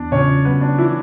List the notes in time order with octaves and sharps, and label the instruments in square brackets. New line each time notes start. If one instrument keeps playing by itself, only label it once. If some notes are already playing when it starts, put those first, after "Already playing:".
Already playing: [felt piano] E2 [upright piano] D4 D5
[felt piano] C#3 [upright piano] C#4 C#5
[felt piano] F#3 [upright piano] B3 B4
[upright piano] D4
E3 E4